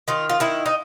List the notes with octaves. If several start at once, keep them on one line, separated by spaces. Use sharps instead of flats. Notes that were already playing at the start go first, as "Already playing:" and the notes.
D#3 F4
F4
D#3 E4
D#4